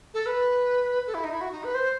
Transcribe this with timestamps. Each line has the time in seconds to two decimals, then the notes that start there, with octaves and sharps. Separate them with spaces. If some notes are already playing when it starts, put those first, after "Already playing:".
0.14 A4
0.26 B4
1.07 A4
1.14 E4
1.24 D#4
1.31 E4
1.41 F#4
1.52 D#4
1.64 B4
1.75 C5